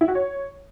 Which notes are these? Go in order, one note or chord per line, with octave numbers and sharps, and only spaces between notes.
E4
F#4
C#5